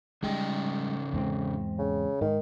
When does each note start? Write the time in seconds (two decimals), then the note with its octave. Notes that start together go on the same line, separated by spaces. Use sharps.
0.23 C#3 G3 G#3 D#4 G5
1.13 E2 G#2 C4
1.79 C#3
2.21 G#2 D#3